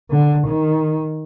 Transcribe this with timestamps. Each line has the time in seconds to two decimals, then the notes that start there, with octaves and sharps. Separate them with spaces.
0.10 D3
0.47 D#3